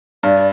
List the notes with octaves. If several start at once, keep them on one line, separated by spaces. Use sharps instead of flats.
G2 D5